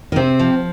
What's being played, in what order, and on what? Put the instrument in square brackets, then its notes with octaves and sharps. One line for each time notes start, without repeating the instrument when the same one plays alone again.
[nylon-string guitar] D#3
[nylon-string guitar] C3 [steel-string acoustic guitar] C4
[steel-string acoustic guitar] F3